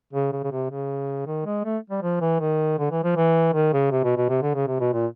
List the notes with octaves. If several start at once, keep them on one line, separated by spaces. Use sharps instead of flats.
C#3
C#3
C#3
C3
C#3
D#3
G#3
A3
G3
F3
E3
D#3
D3
E3
F3
E3
D#3
C#3
C3
B2
B2
C3
D3
C#3
C3
B2
A#2